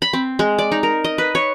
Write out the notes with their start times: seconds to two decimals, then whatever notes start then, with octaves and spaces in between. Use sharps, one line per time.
0.02 B5
0.13 C4
0.39 G#3
0.59 D5
0.72 D#4
0.83 A#4
1.04 D#5
1.18 B4
1.35 C#5